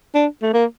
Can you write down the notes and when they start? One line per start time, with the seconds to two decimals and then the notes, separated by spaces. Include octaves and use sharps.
0.15 D4
0.42 A3
0.54 A#3